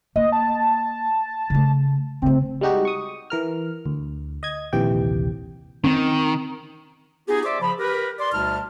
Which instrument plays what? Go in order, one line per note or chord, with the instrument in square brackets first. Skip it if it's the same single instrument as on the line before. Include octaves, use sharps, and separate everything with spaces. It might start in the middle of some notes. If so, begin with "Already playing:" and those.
[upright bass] A#3 [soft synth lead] D#5
[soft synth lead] A5
[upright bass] C#3 A3
[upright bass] C#3 A3 [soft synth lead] C4
[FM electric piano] G3 G#3 D#4 F#4 G4
C#6 D#6
E3 A#4 F6
D2
D#5 G#6
A#1 D#2 C3 E3 G4 G5
[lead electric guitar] D#3 [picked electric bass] C4 C#4
[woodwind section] B3 D#4 F4 G4 G#4
C5 D5 E5 C6 D6
C#3 F3 B5
G4 A#4 B4
D5 C6
D2 B2 G3 D#4 A5 F6